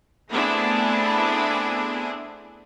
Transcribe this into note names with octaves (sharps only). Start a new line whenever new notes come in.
A3 B3 C4 D4 E4 G#4